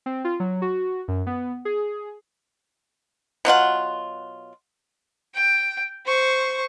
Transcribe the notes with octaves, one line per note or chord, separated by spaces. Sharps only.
C4
F4
F#3
F#4
F#2
B3
G#4
B2 F#3 F4 F#5
G5
C5 C#6